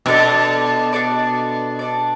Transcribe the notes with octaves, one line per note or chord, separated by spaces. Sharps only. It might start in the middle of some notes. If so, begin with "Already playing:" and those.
B2 D4 A4 D5
D4 A4 D5
D4 A4 D5